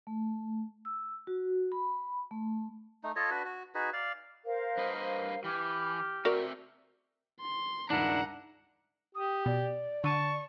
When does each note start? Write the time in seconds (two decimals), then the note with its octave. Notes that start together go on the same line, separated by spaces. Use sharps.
0.07 A3
0.85 E6
1.27 F#4
1.72 B5
2.31 A3
3.04 A3 D#4
3.16 F4 A4 C#5 D#5
3.31 D4 F#4 B4
3.45 F#4
3.75 D#4 F#4 G#4 B4
3.93 D5 F5
4.45 A#4 C5 F5
4.78 G2 B4 D#5
5.44 E3 G4 F6
6.25 A3 C4 F#4 A#4 D5 E5
7.41 C6
7.90 C#2 G2 D#3 D4 E4 F#5 A#5
9.14 G4 D#6
9.46 B2 D5
10.04 D3 A5 C#6 D#7